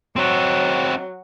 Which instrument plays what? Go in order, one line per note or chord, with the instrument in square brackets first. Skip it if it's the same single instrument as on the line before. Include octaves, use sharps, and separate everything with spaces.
[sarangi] F#3 [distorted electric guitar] C4 F#4